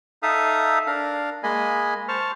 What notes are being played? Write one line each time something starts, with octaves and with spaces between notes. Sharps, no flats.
D#4 A4 E5 F5 D#6
D4 A#4 F5
G#3 A#3 D#5 G#5 B5
C5 A5 C#6 F6